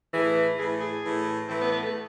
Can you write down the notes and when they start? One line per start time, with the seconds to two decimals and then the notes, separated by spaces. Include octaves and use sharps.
0.12 A2 E3 G#4
0.58 A2 E3 G#4
0.81 G#4
1.03 A2 E3
1.48 A2 E3 C4
1.60 B3
1.71 B3
1.83 A3